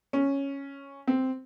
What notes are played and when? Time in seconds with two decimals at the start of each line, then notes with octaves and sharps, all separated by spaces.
0.13 C#4
1.07 C4